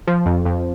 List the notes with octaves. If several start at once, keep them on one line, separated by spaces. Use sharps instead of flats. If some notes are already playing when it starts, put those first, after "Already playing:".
F3
F2
F2